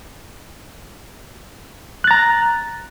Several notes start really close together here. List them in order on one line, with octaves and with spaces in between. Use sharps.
F#6 A6 A#5